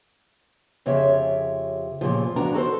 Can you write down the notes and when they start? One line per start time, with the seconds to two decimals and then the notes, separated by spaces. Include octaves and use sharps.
0.86 F2 C#3 F4 G4 C#5 E5
2.01 G2 A#2 C#3 F3
2.36 D2 F3 D4 F#4 B4 A#5
2.54 F#4 A4 A#4 C5